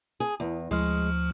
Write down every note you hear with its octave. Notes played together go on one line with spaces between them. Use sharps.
G#4
E2
D2 F3 G#3 F6